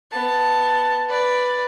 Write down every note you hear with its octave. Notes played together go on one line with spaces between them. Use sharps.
B3 A5
B4 D5